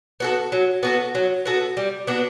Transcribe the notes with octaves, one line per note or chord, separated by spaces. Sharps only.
B3 F#4 A4
F#3
B3 F#4 A4
F#3
B3 F#4 A4
G3
B3 D4 F#4